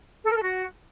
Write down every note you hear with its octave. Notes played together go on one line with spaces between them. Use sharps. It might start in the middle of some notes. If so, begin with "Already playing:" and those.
A4
A#4
A4
F#4